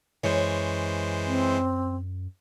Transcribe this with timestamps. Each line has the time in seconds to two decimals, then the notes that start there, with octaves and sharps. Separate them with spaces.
0.23 F#2 E3 G#3 C5 C#5
1.26 C4